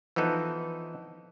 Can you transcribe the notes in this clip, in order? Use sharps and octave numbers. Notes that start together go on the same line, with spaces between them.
E3 F3 B3 D#4 A4